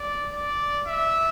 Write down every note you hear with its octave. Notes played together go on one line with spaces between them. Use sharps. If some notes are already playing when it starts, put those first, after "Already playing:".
Already playing: D5
D5
E5